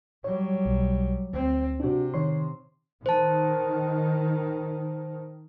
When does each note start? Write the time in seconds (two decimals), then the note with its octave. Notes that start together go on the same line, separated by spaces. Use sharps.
0.24 F#3 G3 C#5
0.66 B1
1.33 D2 C4
1.80 C3 D4 F#4
2.14 D#3 C#5 C6
3.06 D#3 C5 A5